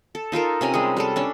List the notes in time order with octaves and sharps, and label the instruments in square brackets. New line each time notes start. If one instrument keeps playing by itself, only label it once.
[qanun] A4
D#4 F4 A4 A#4
C3 C#4 G#5 A#5
G3 G#3 G#4
G3 G#3 A4
C#4 D4